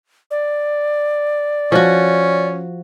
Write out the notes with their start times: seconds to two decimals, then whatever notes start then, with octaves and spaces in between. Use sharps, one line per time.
0.31 D5
1.72 F3 C#4 F#4